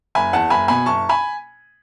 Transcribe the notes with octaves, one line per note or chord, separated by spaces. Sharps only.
F#1 G#5 B5
E2 F#5 A5
F#1 G#5 B5
B2 G#5 B5
F#1 A5 C#6
G#5 B5